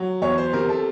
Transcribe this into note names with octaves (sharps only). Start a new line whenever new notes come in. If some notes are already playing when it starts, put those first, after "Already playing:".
Already playing: F#3
E2 C#5
C5
C3 A#4
A4